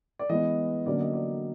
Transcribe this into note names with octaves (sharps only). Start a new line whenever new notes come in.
D5
E3 G#3 B3 D#5
D3 F#3 A#3 C#4 D5
D#5
D5